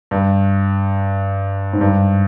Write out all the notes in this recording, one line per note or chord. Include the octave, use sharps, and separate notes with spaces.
G2
G#2
G2